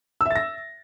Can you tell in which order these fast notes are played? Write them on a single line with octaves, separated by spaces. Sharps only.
E6 E5 A6 A#6